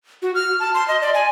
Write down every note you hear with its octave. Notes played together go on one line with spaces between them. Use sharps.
F#4
F6
A5
C6
D#5
D5
G#5